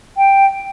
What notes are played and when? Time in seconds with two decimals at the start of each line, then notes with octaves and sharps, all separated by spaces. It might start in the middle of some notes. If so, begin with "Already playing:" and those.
0.17 G5